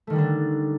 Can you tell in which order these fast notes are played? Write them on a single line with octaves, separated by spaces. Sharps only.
A3 D#3 G3 D3 D4